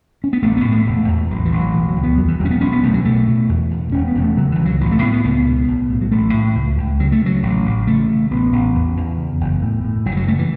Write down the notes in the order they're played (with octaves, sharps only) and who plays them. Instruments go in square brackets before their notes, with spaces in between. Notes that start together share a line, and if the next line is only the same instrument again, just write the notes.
[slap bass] C#4
B3
A1 A3
B3
A2
A3
E1
E2
A1 F#3
E3
A1
F#3
B2 E3
F#3
C#2
B3
E2 F#3
E3
E1 F#3
C#4
B3
B1 C#4
B3
B1 A3
F#3
B2 A3
B2
E2
E2
E1 C#4
B3
E1
A3
C#3 F#3
E3
C#2
F#3
A1 F#3
A3
A2 B3
B3
C#2 B3
B2
B1
A2
F#3
A1 A3
A2
C#2
C#2
C#3 F#3
A3
C#3 F#3
A1
A1
C#3 A3
C#3
A1 B3
A1
E2
E2
C#3
F#1
A2
A2
F#1 F#3
E3
F#3
C#3 A3
E3